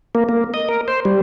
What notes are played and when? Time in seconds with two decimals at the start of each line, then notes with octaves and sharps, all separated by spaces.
0.15 A#3
0.29 A#3
0.54 D#5
0.69 A#4
0.88 C5
1.05 G3